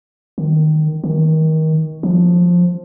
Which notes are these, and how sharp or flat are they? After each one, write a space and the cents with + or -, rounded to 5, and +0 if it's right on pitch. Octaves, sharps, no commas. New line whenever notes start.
D#3 -10
D#3 +25
F3 +10